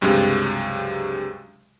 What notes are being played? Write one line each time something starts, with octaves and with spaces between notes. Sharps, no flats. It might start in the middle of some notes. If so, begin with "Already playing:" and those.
C#2 G2 C3 F#3 G#3